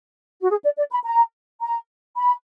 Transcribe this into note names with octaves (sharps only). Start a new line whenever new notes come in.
F#4
G#4
D5
D5
B5
A#5
A#5
B5